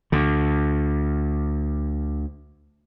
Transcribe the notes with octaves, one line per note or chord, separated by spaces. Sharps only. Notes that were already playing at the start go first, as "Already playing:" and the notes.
D2 D3